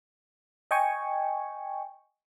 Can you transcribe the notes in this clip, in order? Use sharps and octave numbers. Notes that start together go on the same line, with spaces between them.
D#5 G5 G#5 C#6